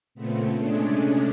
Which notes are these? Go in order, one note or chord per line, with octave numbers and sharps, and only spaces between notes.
A#2 C#3 A3 B3 C4
C3 G#3 A3 C#4 D4 G#4